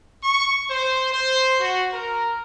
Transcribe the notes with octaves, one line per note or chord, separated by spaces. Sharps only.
C#6
C5
C5
F#4
A#4